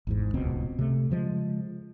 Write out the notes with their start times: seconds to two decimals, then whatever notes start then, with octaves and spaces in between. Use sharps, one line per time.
0.07 G#1 E2 G#2
0.34 D#1 C#2 B2 C4
0.79 C3 A3
1.10 C#3 F3 F#3 G#3